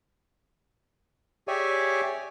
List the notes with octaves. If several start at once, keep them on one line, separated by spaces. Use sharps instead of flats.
G4 G#4 C#5 D5 E5 G#5